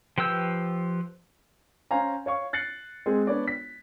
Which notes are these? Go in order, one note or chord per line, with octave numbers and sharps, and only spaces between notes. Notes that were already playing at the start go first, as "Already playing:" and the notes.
F3 G4 B4 E6 G6
C#4 C5 F5 G#5 A#5
C#5 F5 C#6
F#6 A6 C7 C#7 F#7
G#3 C4 G#4
B3 D4 C#5 D5
B6